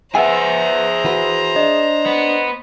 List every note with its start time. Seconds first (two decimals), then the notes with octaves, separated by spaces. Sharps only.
0.15 G#4 B4 C5 E5 F#5 G#5 A#5
1.05 E3 F#4 B4
1.56 D4 D#5
2.06 B3